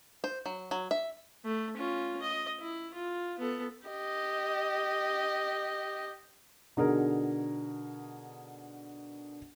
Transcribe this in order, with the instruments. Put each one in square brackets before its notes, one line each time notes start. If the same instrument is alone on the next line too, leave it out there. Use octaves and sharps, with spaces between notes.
[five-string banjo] C5
F#3
F#3
E5
[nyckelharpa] A3
C#4 F4
D#5
E4
F4
B3 A4
[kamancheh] G4 D#5
[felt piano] B2 D3 D#4 G#4 A#4